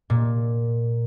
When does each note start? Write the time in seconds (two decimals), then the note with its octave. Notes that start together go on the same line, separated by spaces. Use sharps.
0.10 A#2